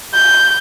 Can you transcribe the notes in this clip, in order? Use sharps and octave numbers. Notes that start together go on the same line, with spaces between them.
G6